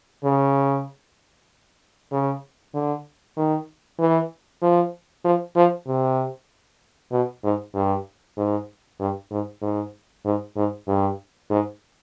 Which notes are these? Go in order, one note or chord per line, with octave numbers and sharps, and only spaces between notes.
C#3
C#3
D3
D#3
E3
F3
F3
F3
C3
B2
G#2
G2
G#2
G2
G#2
G#2
G#2
G#2
G2
G#2